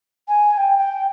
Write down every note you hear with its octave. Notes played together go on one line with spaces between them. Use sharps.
G#5
G#5
G5
G5